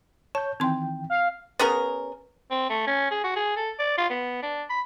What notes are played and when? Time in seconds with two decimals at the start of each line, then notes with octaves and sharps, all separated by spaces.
0.35 C#5 A5 G6
0.60 D#3 E3 C4 G5 C6
1.10 F5
1.59 B3 C#4 G#4 A#4
2.51 C4
2.69 A3
2.87 C#4
3.11 G#4
3.24 F#4
3.36 G#4
3.56 A4
3.79 D5
3.97 F4
4.10 B3
4.42 D4
4.70 B5